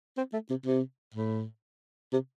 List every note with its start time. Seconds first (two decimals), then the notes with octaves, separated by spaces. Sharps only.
0.17 C4
0.33 A3
0.50 C3
0.66 C3
1.14 A2
2.13 C3